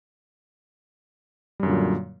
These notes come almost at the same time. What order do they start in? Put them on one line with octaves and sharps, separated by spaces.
G3 F#2 D3 A#2 F#3